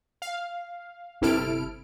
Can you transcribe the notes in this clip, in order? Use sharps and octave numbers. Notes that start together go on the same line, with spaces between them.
F5
G1 C3 E4 A4 F6 D7